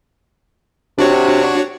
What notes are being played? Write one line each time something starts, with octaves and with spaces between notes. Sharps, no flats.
C3 D4 F#4 C#5